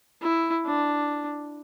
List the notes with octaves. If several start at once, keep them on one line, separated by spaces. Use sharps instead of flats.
E4
D4